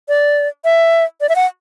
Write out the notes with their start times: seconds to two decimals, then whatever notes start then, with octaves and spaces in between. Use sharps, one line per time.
0.09 D5
0.65 E5
1.21 D5
1.29 E5
1.36 F#5